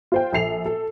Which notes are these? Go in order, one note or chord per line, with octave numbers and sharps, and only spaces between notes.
F4 C5 G5
A#1 A4 C7 F7
A4